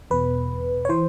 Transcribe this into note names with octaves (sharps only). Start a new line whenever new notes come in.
E2 B2 B4
C#5
E3 C5